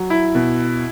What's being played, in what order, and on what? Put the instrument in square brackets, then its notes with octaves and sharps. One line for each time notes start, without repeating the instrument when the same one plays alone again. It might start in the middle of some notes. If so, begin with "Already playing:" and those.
Already playing: [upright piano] F#3
E4
B2